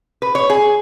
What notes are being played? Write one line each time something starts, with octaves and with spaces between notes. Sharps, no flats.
B4
C#5
G#4